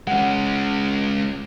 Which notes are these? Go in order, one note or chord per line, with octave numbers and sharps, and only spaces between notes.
G#3 C#4 F#5